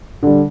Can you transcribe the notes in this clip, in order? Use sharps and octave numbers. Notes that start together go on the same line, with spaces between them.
D3 G3